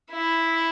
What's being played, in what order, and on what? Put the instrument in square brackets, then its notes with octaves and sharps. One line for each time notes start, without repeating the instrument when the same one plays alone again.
[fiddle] E4